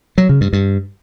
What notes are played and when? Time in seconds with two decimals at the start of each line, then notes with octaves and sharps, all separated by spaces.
0.18 F#3
0.29 C#3
0.41 G2
0.53 G2